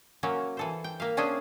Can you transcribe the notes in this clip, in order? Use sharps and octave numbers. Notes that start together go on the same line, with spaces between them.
F#3 A#3 C#4
E3 A4 C5
G5
A#3 E5 F5
C3 C#4 D4 G#4 C5